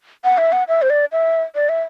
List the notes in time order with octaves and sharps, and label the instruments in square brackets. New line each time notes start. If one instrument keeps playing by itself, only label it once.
[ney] F#5
E5
F#5
E5
C5
D5
E5
D5
E5